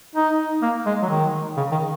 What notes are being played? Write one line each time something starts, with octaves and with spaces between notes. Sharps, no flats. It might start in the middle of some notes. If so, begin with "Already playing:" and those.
D#4
A#3
G#3
F#3
D#3
C#3
D#3